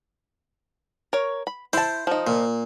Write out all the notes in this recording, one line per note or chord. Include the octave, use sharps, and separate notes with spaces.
A#4 C#5
B5
E4 C5 A5
F3 D#4
A#2